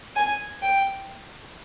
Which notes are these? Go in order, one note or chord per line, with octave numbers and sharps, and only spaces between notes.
G#5
G5